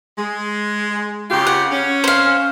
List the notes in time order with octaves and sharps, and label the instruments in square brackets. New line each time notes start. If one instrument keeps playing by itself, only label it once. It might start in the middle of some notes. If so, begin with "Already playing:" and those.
[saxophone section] G#3
C#3 F4 G4
[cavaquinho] F#5
[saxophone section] C#4
[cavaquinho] C5 F5